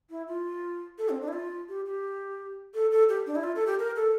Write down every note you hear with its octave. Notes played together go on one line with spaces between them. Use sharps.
E4
F4
A4
C4
D4
E4
F4
G4
G4
A4
A4
G4
D4
E4
F4
A4
G4
A#4
A4